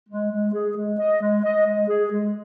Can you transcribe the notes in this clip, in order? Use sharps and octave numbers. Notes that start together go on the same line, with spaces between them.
G#3
G#3
G#4
G#3
D#5
G#3
D#5
G#3
G#4
G#3